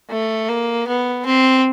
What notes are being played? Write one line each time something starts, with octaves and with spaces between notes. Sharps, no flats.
A3
A#3
B3
C4